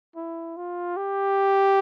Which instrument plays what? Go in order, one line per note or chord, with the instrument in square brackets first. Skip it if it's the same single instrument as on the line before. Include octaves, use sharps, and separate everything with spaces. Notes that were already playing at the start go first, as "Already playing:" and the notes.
[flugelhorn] E4
F4
G4